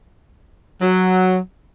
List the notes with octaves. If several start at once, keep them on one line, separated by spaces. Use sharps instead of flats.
F#3